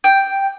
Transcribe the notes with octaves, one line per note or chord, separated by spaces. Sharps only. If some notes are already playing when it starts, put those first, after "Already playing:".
G5